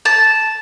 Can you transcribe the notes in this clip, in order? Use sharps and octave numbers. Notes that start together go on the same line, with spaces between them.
A5